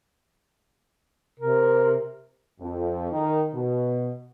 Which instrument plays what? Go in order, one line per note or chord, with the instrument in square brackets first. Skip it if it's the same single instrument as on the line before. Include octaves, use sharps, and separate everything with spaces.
[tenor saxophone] C3 [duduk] A#4
[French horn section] F2
D#3
B2